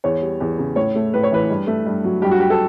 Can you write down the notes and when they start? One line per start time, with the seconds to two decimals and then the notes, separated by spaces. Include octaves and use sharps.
0.04 E2 C#5
0.21 G3
0.40 E2
0.58 C#3
0.76 A2 C#5
0.95 A3
1.14 A2 B4
1.23 C#5
1.32 E3 B4
1.50 G2
1.67 A3
1.86 G2
2.04 F#3
2.22 G2 G4
2.31 F#4
2.40 G3 G4
2.50 A4